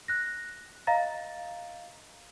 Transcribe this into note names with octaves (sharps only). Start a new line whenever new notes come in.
F#6 A#6
D#5 F5 A#5 A6